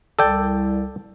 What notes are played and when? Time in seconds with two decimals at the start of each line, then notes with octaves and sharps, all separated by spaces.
0.19 C2 A4 D5 G5